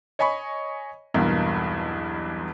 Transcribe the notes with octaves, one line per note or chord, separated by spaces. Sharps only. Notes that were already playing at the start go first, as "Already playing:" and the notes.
C#5 D#5 G#5 B5 C#6
B1 E2 G2 B2 A#3